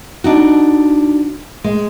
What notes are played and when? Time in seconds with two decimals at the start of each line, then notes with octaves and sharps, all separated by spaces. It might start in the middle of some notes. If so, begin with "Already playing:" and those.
0.24 D4 D#4 F#4
1.64 G#3